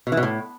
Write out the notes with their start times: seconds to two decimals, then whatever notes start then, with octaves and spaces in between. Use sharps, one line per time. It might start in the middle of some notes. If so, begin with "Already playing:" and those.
0.07 B2
0.12 E3
0.17 B2
0.23 A2